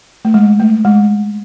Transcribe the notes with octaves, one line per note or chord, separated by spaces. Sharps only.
A3
G#3
A3
G#3